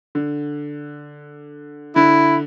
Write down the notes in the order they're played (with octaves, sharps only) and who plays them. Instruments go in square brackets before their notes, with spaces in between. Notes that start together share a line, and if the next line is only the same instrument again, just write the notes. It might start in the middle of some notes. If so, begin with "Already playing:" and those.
[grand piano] D3
[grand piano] D3 [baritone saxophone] E4